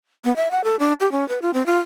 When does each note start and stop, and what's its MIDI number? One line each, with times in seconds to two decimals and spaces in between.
0.25 0.34 59
0.36 0.51 76
0.51 0.64 78
0.64 0.76 69
0.80 0.93 62
1.00 1.11 67
1.12 1.27 61
1.29 1.39 71
1.42 1.51 65
1.54 1.65 60
1.66 1.78 65